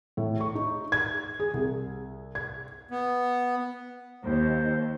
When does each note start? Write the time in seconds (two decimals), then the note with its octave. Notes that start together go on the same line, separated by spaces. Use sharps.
0.17 A2
0.40 C#6
0.55 D#4
0.92 G#6
1.40 G#4
1.54 C2
2.35 G#6
2.91 B3
4.24 D#2 C5